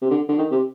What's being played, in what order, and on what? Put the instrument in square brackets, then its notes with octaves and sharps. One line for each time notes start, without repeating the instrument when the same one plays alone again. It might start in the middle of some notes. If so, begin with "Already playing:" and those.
[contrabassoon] C3
D3
D3
D#3
C3